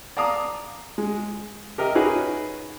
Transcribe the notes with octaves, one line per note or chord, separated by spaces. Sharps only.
D5 F5 A5 A#5 D6 D#6
G#3
G4 A#4 D#5 E5
C#4 D#4 F#4 G#4 B4